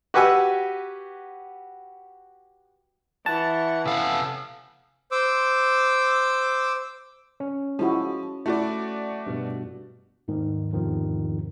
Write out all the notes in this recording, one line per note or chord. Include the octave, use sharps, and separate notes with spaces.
F#4 G4 B4 F#5 G#5 E6
E3 F#5 A5 C#6
C3 B3 C#4 A4 F5 F#5
C5 D6 E6
C#4
F3 G#3 E4 F#4
A3 E4 F#4 D5
G2 B2
D#2 G#2 D#3
E2 G#2 C3 D#3 F3